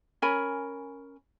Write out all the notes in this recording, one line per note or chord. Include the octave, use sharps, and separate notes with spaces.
C#4 A#4 G#5 B5